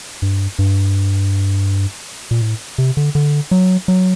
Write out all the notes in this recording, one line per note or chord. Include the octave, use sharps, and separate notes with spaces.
G2
G2
A#2
A2
C3
D3
D3
F#3
F#3